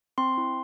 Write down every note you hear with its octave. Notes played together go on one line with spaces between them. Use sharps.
C4 C6
E4